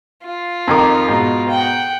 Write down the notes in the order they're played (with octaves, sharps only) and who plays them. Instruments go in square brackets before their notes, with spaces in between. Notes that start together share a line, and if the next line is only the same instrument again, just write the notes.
[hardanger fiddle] F4
[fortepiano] F2 D#3 D6
G#2 B2
[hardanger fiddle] F#5 G5